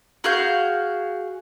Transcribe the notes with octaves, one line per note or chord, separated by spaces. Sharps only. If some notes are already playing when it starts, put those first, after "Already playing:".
F#4 G#4 F5 G6